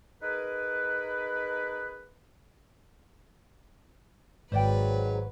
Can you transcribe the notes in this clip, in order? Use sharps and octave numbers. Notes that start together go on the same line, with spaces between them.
D#4 G#4 A#4 B4
G#1 G#2 F#3 B4 C5 D5 G5